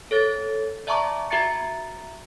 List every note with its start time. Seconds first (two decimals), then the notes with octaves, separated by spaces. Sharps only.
0.11 A4 C#5 A6
0.87 D5 E5 A5 A#5 C#6 D6
1.30 F#4 E5 A#5 A6 C#7